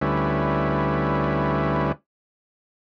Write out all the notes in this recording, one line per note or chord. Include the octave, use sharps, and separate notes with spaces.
D2 G3 C#4 E4 B4